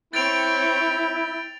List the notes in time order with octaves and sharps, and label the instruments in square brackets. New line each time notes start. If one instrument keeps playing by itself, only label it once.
[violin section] C4 C#5 [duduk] E4 [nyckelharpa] G5 [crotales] A6 D7 F7